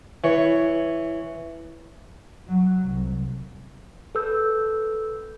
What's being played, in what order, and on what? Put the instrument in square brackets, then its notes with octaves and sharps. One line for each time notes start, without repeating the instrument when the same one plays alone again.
[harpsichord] E3 C#5
[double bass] F#3
C2
[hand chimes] A4 B4 E6 G6